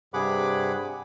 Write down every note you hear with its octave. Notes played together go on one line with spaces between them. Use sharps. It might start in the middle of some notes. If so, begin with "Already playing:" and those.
G2 C3 G#4 F#5 B5 D6